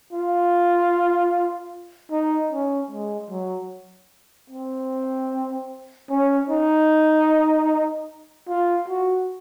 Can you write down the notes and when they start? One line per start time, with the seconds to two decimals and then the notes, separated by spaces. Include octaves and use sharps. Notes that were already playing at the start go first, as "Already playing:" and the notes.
0.13 F4
2.11 D#4
2.51 C#4
2.91 G#3
3.31 F#3
4.50 C4
6.10 C#4
6.50 D#4
8.49 F4
8.88 F#4